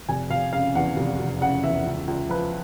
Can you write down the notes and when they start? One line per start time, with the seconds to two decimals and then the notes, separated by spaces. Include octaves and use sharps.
0.08 F1 G#5
0.30 F1 F5
0.53 C#3 F5
0.75 E2 F#5
0.96 F1
1.19 F1
1.41 C#3 F#5
1.63 E2 E5
1.86 C#2
2.07 C#2
2.29 F3 B4